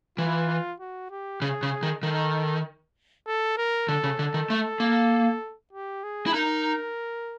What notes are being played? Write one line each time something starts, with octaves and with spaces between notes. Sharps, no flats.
E3 F4
F#4
G4
C#3 G#4
C#3
D#3
D#3 A4
A4
A#4
D3 A4
C#3
D3
D#3
A3
A#3
G4
G#4
E4
D#4 A#4